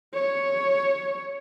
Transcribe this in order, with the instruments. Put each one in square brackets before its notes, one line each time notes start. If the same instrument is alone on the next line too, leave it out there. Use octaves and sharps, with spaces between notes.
[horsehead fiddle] C#5